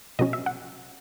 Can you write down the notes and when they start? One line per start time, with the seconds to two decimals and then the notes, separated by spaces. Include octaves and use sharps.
0.19 B2 F#3 C#4 D#5
0.33 E5
0.46 F#5